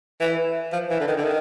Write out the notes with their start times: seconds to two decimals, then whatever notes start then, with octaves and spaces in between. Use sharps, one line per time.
0.20 E3
0.73 F3
0.90 E3
1.00 D3
1.08 D#3
1.17 D3
1.24 D#3